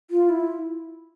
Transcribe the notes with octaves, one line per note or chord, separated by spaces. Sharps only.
F4
E4